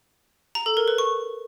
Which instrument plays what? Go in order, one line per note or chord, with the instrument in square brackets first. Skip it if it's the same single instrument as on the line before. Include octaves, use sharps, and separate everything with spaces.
[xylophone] A#5
A4
A#4
B4
C#6